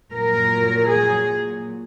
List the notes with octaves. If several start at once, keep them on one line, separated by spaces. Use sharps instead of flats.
A#2 F#3 A#4
G#4